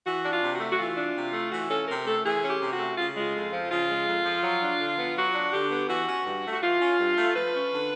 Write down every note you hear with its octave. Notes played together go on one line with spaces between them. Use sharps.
E3 F#4
D4
F4
C3
A3 F#4
F#4
E3 F4
D4
C3
A3
E3 F#4
C#4 A4
C3 A#4
A3 A4
E3 G#4
C#4
G4
C3
F#4
A3
C#3 F4
G#3 F4
F2
F3
C#3 F4
G#3
F2
F3
F#3
D4
D3
B3
F#3 F#4
D4
D3 G4
B3
E3 F#4
C#4
G2
A3
F#4
E3 F4
C#4
G2
A3
F3 B4
C#4
D3